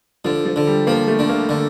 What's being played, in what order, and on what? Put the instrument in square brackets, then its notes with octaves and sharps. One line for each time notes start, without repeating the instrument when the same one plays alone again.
[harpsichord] D3 [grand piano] F3
[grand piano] F3
[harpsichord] D3
[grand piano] G3
[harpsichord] F3 [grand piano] A#3
[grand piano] A3
[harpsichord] D3
[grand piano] A#3
[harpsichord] D3